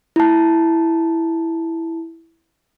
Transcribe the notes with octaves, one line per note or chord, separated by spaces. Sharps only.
E4 A5